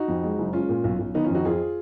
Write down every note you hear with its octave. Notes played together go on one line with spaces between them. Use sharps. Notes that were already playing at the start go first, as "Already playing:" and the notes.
Already playing: D#4 F#4
F2
G#3
F#1
G#3 C#4 F4
A#2
B1
B1
D#3 B3 D#4
C#4 F4
F2
D#4 F#4
F2 F4 G#4